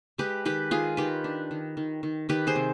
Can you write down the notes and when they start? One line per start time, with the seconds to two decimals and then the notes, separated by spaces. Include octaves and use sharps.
0.18 G#3 G4 B4
0.45 D#3 G4 B4
0.71 D#3 F4 G#4
0.97 D#3 G4 B4
1.24 D4
1.51 D#3
1.77 D#3
2.03 D#3
2.29 D#3 G4 B4
2.47 G#4 C5
2.56 C3